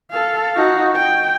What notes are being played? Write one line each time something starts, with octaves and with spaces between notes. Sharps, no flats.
A4 F5
D#4 F#4
G5